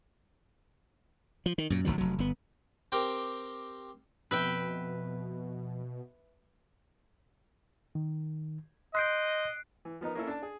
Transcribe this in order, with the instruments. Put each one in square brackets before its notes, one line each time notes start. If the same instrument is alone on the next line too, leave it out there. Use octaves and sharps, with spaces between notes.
[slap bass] F3
D#3
F#2 A#2
G#1 D#2 D#3 F#3
F1 F#3
G1 B3
[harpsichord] C4 G4 A#4
[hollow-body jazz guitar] F2 [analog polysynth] B2 [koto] B4 E5 G5
[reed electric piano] D#3
[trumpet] D#5 [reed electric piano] C6 G6 [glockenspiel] F#6 C7 D7
[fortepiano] E3
F3 B3 D#4 A#4
A#3 C#4 E4 A4
D4 A5
G#4